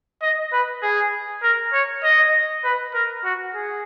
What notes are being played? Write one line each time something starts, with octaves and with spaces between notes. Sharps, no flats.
D#5
B4
G#4
A#4
C#5
D#5
B4
A#4
F#4
G#4